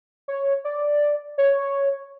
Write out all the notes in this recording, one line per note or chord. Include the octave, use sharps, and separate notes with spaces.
C#5
D5
C#5